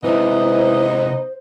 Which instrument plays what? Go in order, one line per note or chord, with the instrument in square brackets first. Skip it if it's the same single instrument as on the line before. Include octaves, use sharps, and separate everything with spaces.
[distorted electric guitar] C3 G#3 [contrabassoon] E3 [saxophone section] B3 D#4 D#5 [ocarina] C5